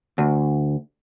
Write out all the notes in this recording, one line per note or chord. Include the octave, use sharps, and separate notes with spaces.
D2